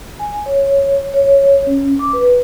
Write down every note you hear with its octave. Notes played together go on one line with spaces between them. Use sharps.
G#5
C#5
C#5
C#4
D6
B4